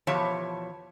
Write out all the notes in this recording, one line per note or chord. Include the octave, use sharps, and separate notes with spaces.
E2 B2 F3 G4 C#5 A5